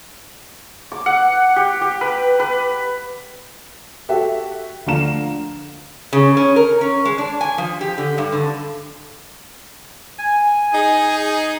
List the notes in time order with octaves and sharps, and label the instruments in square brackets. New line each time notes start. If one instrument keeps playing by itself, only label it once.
[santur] D6
F#5
G4
G4
B4
B4
[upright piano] F#4 G4 A4 E5 G5
D2 F3 D4 F5 A#5 E7
[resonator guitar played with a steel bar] C#3
C#4
A#4
C#4
G#3
D4
G#5
F3
G4
D3
G2
D3
[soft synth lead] G#5
[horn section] D#4 G#4